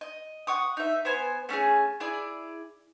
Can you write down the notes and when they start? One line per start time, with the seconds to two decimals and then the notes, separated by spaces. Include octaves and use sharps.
0.01 D#5
0.47 F#5 C#6 D#6
0.77 D#4 E5
1.05 B3 C5 G#5
1.49 A3 C#4 F4 G#4
2.00 E4 G#4 D5